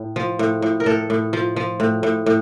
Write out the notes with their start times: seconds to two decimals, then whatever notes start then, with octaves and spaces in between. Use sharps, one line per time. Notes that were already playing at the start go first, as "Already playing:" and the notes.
Already playing: A2
0.16 F3
0.39 A2
0.62 A2
0.80 A#4
0.86 A2 A4
1.10 A2
1.33 F3
1.56 F3
1.80 A2
2.03 A2
2.26 A2